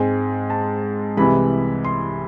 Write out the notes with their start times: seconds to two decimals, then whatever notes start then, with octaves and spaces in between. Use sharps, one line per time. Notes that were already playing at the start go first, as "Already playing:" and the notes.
Already playing: G#2 G#3 C4 G#5
0.50 A5
1.17 C2 C3 E3 G#3 B5
1.85 C6